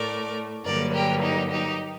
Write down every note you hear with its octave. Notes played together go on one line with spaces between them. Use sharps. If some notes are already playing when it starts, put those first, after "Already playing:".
Already playing: A2 A3 A#4 D5
G2 D3 F#3 A#3 A#4 D5
G4 A#4
D#4 G4
D#4 G4